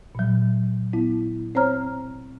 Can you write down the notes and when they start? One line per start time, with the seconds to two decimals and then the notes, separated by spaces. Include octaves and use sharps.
0.15 A#2 F#3
0.93 B3 E4
1.55 C4 C5 C#5 A#5 F6